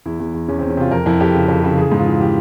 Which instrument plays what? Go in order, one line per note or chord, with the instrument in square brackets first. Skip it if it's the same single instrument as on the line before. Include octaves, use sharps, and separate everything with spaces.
[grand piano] E2 E4
E2
E2
E2 C#4
C4
E2
C#4
C3 F4
F2 A#4
F2 E4
F2 G4
C#3
F2
C#3
E3 G#4
G#2
F4
E3
E3 G4